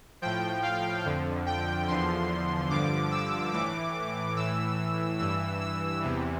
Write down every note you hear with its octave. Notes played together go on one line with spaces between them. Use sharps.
A2 F3 G5
F5
F2 D3 F3
G5
E2 D3 F3 C6
G2 D3 F3 D6
E6
A2 E3 D6
A2 E3 E6
G2 E3 E6
E6
E2 C3 E3